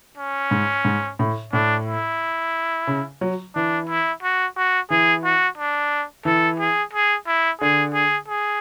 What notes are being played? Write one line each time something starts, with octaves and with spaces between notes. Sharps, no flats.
C#4
G#2
G#2
A2
A2 D4
E4
C#3
F#3
E3 D4
E4
F#4
F#4
E3 G#4
F#4
D4
E3 A4
G#4
G#4
E4
D3 G#4
G#4
G#4